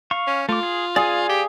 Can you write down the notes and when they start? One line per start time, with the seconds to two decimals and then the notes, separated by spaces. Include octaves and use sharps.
0.11 F5 C#6
0.27 C#4
0.49 A3 F4 D6
0.63 G#4
0.96 G#4 D5 F5 G#5
1.29 G4